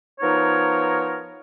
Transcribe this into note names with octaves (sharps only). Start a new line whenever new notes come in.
F3 B3 D#4 A#4 C#5